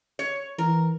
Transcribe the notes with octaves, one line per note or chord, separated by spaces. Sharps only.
C#5
E3 A#4